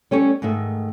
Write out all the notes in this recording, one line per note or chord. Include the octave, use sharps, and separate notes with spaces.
G3 C#4 A4 C#5
G#2 D#3 A3 E5